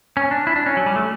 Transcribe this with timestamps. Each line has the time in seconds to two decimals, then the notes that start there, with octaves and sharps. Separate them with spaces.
0.17 C#4
0.31 D4
0.47 E4
0.56 D4
0.66 C#4
0.77 F#3
0.86 G3
0.96 A3